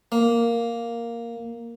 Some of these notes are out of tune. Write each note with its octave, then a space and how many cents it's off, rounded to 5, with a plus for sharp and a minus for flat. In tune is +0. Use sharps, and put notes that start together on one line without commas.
A#3 +0